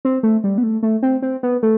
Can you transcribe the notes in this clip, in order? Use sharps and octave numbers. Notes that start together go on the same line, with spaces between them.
C4
A3
G3
B3
A3
A3
C4
C4
B3
A3